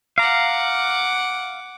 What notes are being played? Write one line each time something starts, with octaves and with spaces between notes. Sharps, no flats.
F5 F#5 A#5 D6